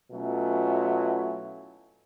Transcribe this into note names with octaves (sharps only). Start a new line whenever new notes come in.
B2 F#3 A3 C#4 E4 F4